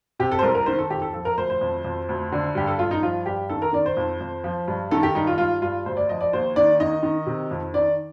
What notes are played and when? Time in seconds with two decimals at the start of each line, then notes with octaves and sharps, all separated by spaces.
0.19 C3 G4
0.32 A4
0.39 C5
0.43 C2 A#4
0.55 A#4
0.66 D#3 C5
0.79 A4
0.90 F2 G4
1.02 A4
1.14 F3 A4
1.25 A#4
1.37 D2 C5
1.50 C5
1.61 F2
1.84 F2
2.09 D2
2.32 D3
2.55 G2 G4
2.67 A4
2.79 G2 F4
2.91 D#4
3.02 F3 F4
3.26 G2 G4
3.49 D#3 A4
3.62 A#4
3.73 D#3 D5
3.86 C5
3.97 F2
4.21 F2
4.44 F3
4.68 G2
4.91 D#3 A4
5.03 G4
5.15 G2 D#4
5.27 F4
5.38 G2 F4
5.62 G2 F4
5.86 D2 C5
5.97 D5
6.09 F3 D#5
6.21 D5
6.33 D#2 C5
6.56 D#3 D5
6.80 D#3 D#5
7.03 D#3
7.26 C3
7.51 F2
7.74 D#3 D5